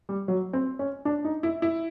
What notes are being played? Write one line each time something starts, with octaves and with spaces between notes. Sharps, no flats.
G3
F#3
C4
C#4
D4
D#4
E4
E4